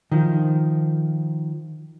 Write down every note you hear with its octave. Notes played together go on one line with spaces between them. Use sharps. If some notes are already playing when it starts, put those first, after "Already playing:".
D#3 F3